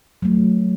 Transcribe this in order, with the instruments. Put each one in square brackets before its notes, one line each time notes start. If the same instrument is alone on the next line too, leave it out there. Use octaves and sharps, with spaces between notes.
[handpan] F#3 A3